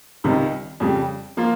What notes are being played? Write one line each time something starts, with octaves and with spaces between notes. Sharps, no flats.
C#2 C3 D#3 G3
F2 C#3 G3
F3 A#3 F4